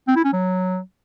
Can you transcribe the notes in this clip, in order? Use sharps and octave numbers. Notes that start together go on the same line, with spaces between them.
C4
E4
C#4
F#3